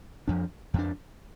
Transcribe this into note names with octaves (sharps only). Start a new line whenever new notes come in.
F2 F3 D4
F2 F3 D4